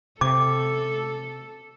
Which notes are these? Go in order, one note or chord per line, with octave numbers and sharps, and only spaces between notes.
C3 A4 D6